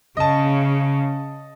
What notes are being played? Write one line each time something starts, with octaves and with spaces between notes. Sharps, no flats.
C#3 D#5 A5